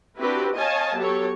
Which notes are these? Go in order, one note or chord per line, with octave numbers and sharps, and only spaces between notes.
C4 D4 E4 F#4 G4 B4
C#5 D#5 F5 G#5 A5
F#3 B3 G4 A4 C#5